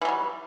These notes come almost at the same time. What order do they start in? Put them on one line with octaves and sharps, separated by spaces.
E3 F#3 G3